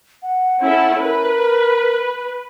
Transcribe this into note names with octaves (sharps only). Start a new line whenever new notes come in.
F#5
C#4 E4 A4
A#4 B4